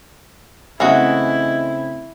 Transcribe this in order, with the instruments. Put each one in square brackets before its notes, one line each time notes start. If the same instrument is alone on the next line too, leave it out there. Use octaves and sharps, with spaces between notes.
[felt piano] C#3 A3 C4 [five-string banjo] E3 G#3 F#4 [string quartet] E4